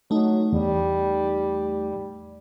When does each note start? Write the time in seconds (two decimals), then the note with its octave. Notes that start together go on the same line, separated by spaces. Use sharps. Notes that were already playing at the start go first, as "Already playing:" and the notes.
0.11 F#3 A3 D#4
0.52 E2 G3